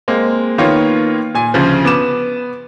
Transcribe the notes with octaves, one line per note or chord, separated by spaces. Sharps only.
G#3 A#3 C4
D#3 A#3 B3 F4 C#5
A#2 G#5
D2 C#3 F3
B3 D6 E7